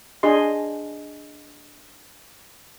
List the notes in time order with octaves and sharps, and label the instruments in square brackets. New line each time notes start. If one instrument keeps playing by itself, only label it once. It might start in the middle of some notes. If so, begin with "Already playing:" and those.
[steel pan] D4 G#4 D#5 C6